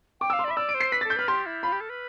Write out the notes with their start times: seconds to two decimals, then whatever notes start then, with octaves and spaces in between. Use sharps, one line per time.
0.21 G5 D6
0.30 E6
0.33 F5
0.39 C6
0.44 D5
0.48 B5
0.51 E5
0.56 D5 E6
0.69 D7
0.74 C5
0.80 C7
0.92 B4 B6
1.01 A6
1.05 A4
1.10 G6
1.16 B4 F6
1.28 G4 C6
1.46 E4
1.63 F4 B5
1.72 G4
1.81 A4
1.89 B4